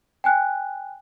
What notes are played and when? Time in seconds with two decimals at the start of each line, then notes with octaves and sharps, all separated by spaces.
0.24 G5 G#5 F#6